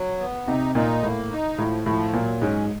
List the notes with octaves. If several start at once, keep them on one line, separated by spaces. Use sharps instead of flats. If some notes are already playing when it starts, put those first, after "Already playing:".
Already playing: F#3
B3
C3 D#4
A#2 D#4
A2 A#3
D#4
A2 F3
A2 F3
A#2 F#3
G#2 C#4